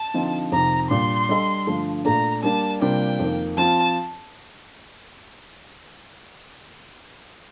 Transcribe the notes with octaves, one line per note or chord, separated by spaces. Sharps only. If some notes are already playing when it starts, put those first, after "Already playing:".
Already playing: A5
D3 F3 C4 D#4
F2 C3 D#3 A#5
A#2 G3 D4 C6
G3 D4 A4 D#5
G2 D3 F3 A3
A#2 A3 D4 A#5
G3 A#3 D4 A5
C3 G3 A#3 D4 F4 G5
F2 D#3 A#3
F3 C4 F4 A5